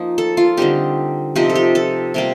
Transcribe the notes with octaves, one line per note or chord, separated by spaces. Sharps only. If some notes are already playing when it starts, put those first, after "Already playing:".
Already playing: F3 A#3 D#4
A4
F4
D3 G3 C4 D#4 G4
C3 F3 C4 D#4 G4
A4
G4
A4
C3 G3 A#3